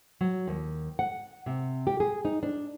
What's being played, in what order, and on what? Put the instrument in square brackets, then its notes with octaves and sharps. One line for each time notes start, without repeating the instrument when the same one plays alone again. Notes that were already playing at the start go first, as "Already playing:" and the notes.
[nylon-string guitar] F#3
D#2
F#5
C3
G4
G#4
D#4
D4